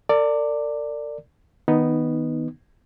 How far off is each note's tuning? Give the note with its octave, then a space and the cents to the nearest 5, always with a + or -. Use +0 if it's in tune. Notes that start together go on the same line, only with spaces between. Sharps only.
A#4 -45 D5 +0
D#3 +25 B3 +0 D#4 +0